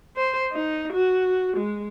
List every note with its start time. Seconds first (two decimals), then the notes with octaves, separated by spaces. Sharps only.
0.16 C5
0.52 D#4
0.93 F#4
1.57 G#3